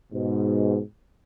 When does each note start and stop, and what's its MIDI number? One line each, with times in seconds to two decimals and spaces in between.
0.13 0.80 44
0.13 0.80 47